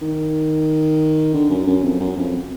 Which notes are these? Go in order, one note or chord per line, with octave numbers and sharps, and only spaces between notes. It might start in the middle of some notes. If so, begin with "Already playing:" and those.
D#3
D3
F#2
F#2
F2
F#2
F2